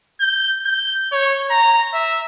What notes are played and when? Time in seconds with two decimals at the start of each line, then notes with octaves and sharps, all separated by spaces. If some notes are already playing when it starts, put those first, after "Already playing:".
0.20 G6
0.66 G6
1.12 C#5
1.51 A#5
1.93 E5